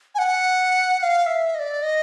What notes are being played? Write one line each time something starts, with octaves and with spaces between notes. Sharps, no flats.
G#5
F#5
F#5
F5
E5
D#5
D5
D#5